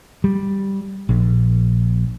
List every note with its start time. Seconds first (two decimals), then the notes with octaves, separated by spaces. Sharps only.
0.24 G3
1.09 A#1